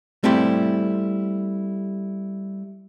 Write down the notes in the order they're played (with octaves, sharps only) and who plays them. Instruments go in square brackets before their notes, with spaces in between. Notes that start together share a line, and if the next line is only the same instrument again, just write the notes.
[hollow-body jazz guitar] G3 A3 C4 E4 G4